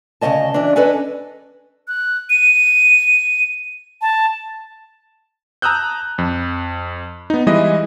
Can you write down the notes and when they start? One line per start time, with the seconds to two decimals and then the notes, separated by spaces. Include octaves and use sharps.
0.21 D2 C#3 E3 A#3 D#5 A5
0.54 E3 D4
0.76 C#4 D4 A4 B4 D#5
1.88 F#6
2.30 D#7
4.02 A5
5.62 A5 A#5 D#6 E6 F#6 G6
6.18 F2
7.30 B3 D#4
7.47 E3 G3 G#3 E4 B4 D#5